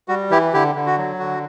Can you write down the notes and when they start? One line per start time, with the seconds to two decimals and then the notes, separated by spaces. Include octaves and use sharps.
0.08 G3 F#4
0.31 E3 E4 G4
0.53 D3 E4 G4
0.75 D3
0.86 F#4
0.98 F#3
1.19 D3 F#4